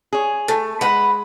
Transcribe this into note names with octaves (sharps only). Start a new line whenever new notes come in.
G#4 C#5
A3
G#3 B4 F#5